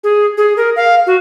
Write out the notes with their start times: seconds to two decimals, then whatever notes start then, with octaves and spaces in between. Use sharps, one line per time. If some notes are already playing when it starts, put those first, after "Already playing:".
0.04 G#4
0.37 G#4
0.57 A#4
0.76 F5
1.06 F#4